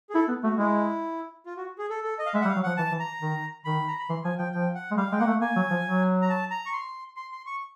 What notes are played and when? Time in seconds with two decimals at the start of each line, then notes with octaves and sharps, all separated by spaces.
0.10 G#4
0.14 E4 A4
0.28 B3
0.44 A3 F#4
0.57 G#3 E4
1.46 F4
1.57 F#4
1.79 G#4
1.90 A4
2.04 A4
2.19 D#5
2.26 F5
2.34 G#3 E5
2.41 F#5
2.45 G3
2.48 F5
2.56 F#3
2.63 F3 F#5
2.77 E3 A5
2.92 E3
3.00 A#5
3.21 D#3
3.65 D#3 B5
3.88 A#5
3.99 B5
4.09 E3 C6
4.24 F3 G#5
4.38 F3 G5
4.53 F3 G5
4.75 F#5
4.91 G#3
4.97 G3 F5
5.12 G#3 G5
5.19 A#3 F#5
5.27 A3
5.41 A#3 G#5
5.56 F#3
5.70 F3
5.85 F#3
6.22 A#5
6.29 A5
6.51 A#5
6.66 C#6
6.73 C6
7.16 C6
7.32 C6
7.46 C#6